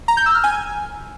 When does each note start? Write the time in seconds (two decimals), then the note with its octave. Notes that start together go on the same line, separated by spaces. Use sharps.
0.08 A#5
0.17 G6
0.26 E6
0.35 F6
0.44 G#5